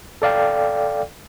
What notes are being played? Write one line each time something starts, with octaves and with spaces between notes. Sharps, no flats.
A4 D5 F5 G5